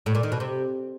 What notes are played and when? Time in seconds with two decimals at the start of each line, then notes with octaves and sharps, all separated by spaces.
0.06 A2
0.15 A#2
0.23 D#3
0.32 B2
0.40 C3